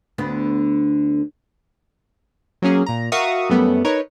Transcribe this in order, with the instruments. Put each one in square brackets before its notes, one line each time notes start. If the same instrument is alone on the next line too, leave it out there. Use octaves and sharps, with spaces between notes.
[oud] D2 D3 B3
[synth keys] F#3 A#3 C#4 G#4
A#2 A#5
F#4 A#4 E5 F5 C#6 D#6
F#2 G3 A3 B3
D#4 A#4 B4 C#5